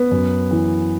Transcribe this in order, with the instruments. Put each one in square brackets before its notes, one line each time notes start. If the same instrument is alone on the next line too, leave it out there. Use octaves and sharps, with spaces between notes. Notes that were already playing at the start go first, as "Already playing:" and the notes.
Already playing: [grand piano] B3 B4
F#2
E3